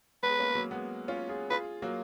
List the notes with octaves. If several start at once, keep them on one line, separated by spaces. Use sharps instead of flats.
G#3 B3 B4
A#3 C#4
F#3 A#3
G#3 B3
C#4 F4
F4 G#4
F4 G#4 B4
F#3 A#3